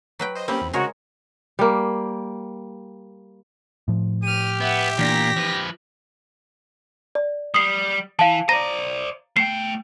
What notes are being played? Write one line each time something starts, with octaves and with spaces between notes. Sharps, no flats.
F#3 B4 G5
C5 D#5
A#3 C4 C#4 G4 B5
E2
C#3 G#3 F#4 A#4 C#5
G3 A#3
A2 F3
G4 F6 D#7
B3 E5 F#5
A#2 E3 B3 D4 A#6 B6
F3 B4
D5
G3 D#6 C7
E3 F5 A5
C5 D5 A#5 A#6 D#7
A3 G5 C7